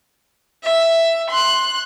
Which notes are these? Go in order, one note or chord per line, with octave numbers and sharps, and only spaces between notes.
E5
C6 F#6